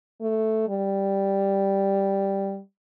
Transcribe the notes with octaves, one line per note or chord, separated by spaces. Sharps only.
A3
G3